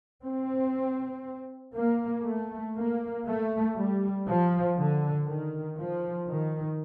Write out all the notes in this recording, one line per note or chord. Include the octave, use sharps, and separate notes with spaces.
C4
A#3
A3
A#3
A3
G3
F3
D3
D#3
F3
D#3